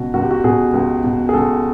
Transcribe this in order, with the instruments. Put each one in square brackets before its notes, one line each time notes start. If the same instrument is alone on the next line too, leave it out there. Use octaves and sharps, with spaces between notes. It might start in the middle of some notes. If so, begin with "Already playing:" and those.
Already playing: [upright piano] C#2 B2 F#4
C#2 F#4
G4
F#4
B2 G#4
C#2
B2
G#4
C#2 A4